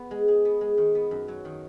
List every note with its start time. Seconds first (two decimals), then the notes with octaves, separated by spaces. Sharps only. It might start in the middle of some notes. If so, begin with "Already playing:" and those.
Already playing: B3
0.11 G#3
0.28 G#4
0.45 B3
0.61 G#3
0.78 D#3
0.95 B3
1.11 F#2
1.28 F#3
1.45 D#3